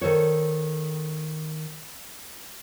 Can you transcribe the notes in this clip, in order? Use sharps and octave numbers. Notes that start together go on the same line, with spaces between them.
D#3 A4 C5 C#5